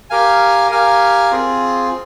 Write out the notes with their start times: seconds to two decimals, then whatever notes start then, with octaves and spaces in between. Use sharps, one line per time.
0.10 G4 A#4 F5 G#5
0.71 G4 A#4 F5 G#5
1.31 C4 F4 G#4